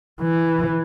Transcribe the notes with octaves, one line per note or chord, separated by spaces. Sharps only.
E3